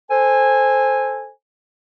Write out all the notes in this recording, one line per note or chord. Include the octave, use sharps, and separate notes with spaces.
A4 C5 G#5